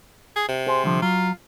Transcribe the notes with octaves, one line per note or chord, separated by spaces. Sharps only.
G#4
C3
G#4 C5
C2 D3 F3
F#3 F4